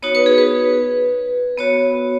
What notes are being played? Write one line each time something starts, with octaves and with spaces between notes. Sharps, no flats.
B3 D#4 F#4 C#5
B4
G#4
B4
B3 F#4 C#5